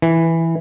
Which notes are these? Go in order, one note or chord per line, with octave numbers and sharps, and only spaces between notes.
E3